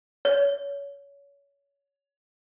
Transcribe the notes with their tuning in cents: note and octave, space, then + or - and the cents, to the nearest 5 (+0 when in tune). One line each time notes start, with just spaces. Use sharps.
C#5 +25